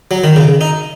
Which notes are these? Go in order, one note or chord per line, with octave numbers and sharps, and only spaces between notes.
F#3
D#3
C#3
D#4